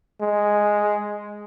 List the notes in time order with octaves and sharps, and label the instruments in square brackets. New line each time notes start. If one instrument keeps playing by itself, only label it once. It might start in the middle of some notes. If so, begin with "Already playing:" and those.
[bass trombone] G#3